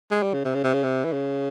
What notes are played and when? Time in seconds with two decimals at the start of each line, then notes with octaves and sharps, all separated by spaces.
0.11 G#3
0.22 G3
0.33 C#3
0.45 C3
0.54 C#3
0.64 C3
0.73 C#3
0.83 C3
1.04 E3
1.13 C#3